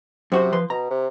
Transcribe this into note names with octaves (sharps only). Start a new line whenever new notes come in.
F#2 C3 F#4 C5
F3 B4 C6
B2 A#5
C3